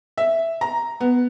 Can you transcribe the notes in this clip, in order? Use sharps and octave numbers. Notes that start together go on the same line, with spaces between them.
E5
A#5
B3